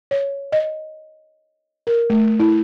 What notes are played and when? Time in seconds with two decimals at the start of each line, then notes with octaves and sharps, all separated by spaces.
0.11 C#5
0.52 D#5
1.87 A#4
2.10 A3
2.40 E4